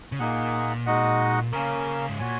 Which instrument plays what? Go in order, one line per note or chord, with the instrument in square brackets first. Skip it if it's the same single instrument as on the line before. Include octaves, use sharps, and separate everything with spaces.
[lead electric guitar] C#3
[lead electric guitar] A#2 [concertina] A#3 D#4 G#4 F#5
[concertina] G#3 D#4 F#4 D#5 F#5
[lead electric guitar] C#3 [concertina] A#3 C#4 A#4
[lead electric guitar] G#2
[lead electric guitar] A#2 [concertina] F#4 C#5 G#5